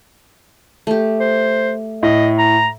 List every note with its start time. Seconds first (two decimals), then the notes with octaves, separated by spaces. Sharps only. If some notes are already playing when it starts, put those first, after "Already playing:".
0.87 A3 G4
1.20 C5
2.03 A2 D#5
2.38 A#5